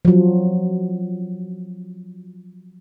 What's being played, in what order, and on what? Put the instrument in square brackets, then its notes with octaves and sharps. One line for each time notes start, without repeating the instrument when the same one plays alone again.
[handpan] F3 F#3